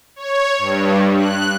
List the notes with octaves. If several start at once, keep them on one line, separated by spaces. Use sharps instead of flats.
C#5
G2
F#6